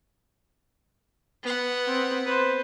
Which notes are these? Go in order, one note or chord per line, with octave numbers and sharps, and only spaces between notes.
B3 F#5
C4
B4 C5